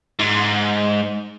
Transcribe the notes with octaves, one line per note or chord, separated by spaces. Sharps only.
G#2